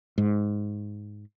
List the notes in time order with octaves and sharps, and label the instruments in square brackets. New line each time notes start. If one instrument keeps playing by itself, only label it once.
[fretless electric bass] G#2